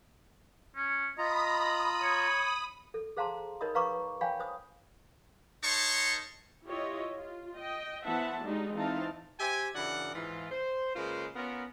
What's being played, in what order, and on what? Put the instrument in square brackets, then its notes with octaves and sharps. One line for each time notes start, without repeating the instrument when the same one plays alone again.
[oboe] C#4
[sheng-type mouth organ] F4 A#5 [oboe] D#5 [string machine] B5 D#6
[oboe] C#5
[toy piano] A4
G#4 C5 F5 A5 A#5 C6
D#4 A#4 C#5 D#5 B5 D#6
B4 F5 A#5 C#6 D6
C#5 F5 G5 G#5 B5
C5 D#6
[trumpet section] D#4 A#4 C#5 A5 C6 C#6
[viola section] E4 F4 G4 C#5 D#5
F4
D#5 G5
E3 B3 C5 E5 F#5 A5
G3 G#3 D4 D#4 F#4
E3 C4 D#4 F5 A5
[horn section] G4 C5 E5 G5 G#5
C#3 E3 D4 F#4 A#4 F#5
G#2 E3 F4
C5
C#3 G#3 A#3 F4 B4 C5
B3 C#4 F4 A#4